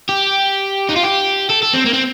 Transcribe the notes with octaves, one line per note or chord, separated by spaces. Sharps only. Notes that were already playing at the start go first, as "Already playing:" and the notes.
G4
D#4
F4
G4
A4
A4
C4
A#3
C4